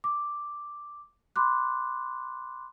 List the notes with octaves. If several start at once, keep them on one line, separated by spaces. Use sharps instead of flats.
D6
B5 C6 D6 F#6